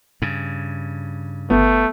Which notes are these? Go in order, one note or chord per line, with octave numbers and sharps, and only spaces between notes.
G2 C#3
G1 A3 B3